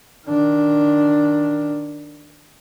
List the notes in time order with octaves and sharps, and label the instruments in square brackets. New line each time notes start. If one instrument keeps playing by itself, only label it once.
[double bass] D#3 D4